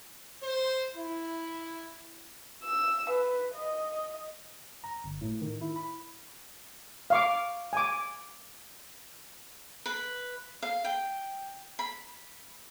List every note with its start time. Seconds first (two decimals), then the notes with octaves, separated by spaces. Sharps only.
0.43 C5
0.96 E4
2.63 E6
3.10 B4
3.55 D#5
4.84 A#5
5.04 G1
5.21 A2
5.41 D#3
5.61 E4
5.76 B5
7.10 F5 C#6 D6
7.73 G#5 D6
9.86 B4
10.62 F5
10.85 G5
11.79 B5